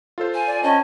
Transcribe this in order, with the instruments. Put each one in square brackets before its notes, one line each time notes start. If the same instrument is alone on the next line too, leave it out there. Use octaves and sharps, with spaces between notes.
[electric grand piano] F4 A4 C5
[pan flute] G#5
[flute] D5
[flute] C#4 [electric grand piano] C5 G5 D#7 [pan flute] D#5 [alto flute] A5